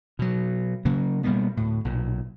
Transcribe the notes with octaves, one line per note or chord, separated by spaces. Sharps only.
B2 F#3
C#3 F#3 A#3
B2 G3 A#3 B3
D2 A2
B1 A#2